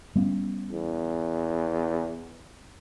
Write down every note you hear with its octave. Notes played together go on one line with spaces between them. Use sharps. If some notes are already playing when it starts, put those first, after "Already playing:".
G3 B3 C#4
E2